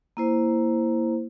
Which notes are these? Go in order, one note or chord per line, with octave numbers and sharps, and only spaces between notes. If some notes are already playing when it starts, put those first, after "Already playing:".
A#3 E4 C5